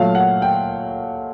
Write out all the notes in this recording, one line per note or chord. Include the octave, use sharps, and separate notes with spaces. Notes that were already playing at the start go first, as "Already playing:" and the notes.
Already playing: A#2 F#3 A3 F5
F#5
G5